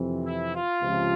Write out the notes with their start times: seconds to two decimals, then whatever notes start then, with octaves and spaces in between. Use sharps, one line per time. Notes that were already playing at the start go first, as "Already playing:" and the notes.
Already playing: F2 C3 E3
0.24 E4
0.53 F4
0.82 C#2 C3 F3